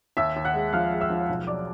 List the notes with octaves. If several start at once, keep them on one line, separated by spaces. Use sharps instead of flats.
D#2 E5 E6
D#2
F#5 F#6
G#3
F3 F5 F6
G#3
E5 E6
F3
B1
F#3 D5 D6